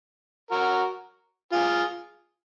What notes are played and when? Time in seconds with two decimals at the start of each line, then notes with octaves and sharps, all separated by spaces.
0.51 F#4 A#4
1.52 F4 G#4